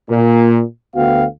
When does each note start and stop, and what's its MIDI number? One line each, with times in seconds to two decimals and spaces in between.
0.10 0.62 46
0.96 1.25 38
0.96 1.25 59
0.96 1.25 66
0.96 1.25 77
0.96 1.25 79